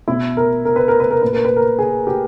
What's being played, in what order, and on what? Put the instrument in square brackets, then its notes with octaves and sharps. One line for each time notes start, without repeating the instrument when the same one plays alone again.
[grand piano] B2 E4
A#4
A#4
B4
A#4
B4
A#4
A#2 B4
A#4
B4
A#4
G#4
G4